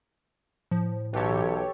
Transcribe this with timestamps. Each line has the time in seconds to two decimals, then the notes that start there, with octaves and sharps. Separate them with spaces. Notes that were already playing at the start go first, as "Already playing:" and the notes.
0.71 A2 F3
1.14 B1 E3 G4 A4 C#5